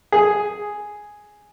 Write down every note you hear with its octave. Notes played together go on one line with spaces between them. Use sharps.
G#4